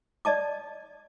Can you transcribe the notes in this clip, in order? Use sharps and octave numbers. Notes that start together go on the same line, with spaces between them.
D5 D#5 A5 D6